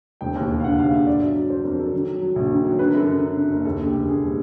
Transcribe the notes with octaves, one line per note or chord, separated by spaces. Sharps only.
E1 G5
D#2
D#2
F5
D3 F#5
D#2 F5
D3 E5
G1 D5
F#3
F#3
D3 C5
F2 A#4
F#3 A4
D#3
F#3
F#3
A#1
D#3
F#3
D3 B4
A#4
F#2 A4
D3 A#4
D3
F#2
F#1 A#4
D#2 A4
D3
G4
E1
D3 G#4
G3